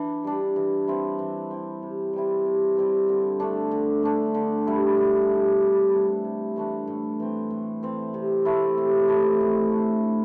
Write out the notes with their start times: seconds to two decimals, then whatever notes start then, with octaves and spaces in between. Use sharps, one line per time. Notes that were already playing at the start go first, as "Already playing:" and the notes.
Already playing: E3 D4
0.24 G3 D4
0.56 E3
0.88 C4 E4
1.19 E3
1.51 C4 E4
1.82 C3
2.13 G3 C4 E4
2.45 C3
2.77 G3 C4 E4
3.09 D3
3.40 A3 D4
3.71 D3
4.03 A3 D4
4.34 D3
4.67 G3 E4
4.98 D3
5.30 G3 E4
5.61 C3
5.93 E3 A3 D4
6.24 C3
6.56 E3 A3 D4
6.87 A2
7.20 E3 C4
7.50 A2
7.83 E3 C4
8.14 C3
8.45 A3 E4
8.78 C3
9.08 A3 E4
9.40 A2
9.71 A3 D4
10.03 A2